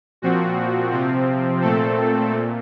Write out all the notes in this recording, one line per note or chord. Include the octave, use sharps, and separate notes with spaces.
A#2 F3 C4 F#4
C3 F3 C4
A#2 A3 C4 A4
A#2